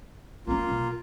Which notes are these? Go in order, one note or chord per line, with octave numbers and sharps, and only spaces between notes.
A#3 C#4 D4 F4
B1